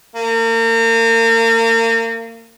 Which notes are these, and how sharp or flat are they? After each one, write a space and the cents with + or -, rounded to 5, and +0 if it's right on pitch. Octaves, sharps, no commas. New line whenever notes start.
A#3 -35